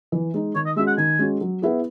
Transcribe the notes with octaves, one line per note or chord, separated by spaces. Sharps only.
E3
G#3 D#4
D#3 C#5
D#5
G#3 C#4 F#4 E5
F#5
D#3 G#5
G#3 C#4 F#4
F#3
B3 E4 G#4